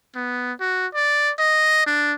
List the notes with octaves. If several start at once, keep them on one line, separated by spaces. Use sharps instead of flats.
B3
F#4
D5
D#5
D4